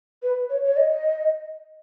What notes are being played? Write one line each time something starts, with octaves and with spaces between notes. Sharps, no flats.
B4
C#5
C#5
D#5